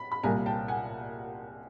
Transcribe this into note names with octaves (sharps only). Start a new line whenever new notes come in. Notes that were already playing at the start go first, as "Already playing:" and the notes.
Already playing: B5
B5
C2 A#2 G3 A#3 G#5 A#5
G5 A5
F#5 G#5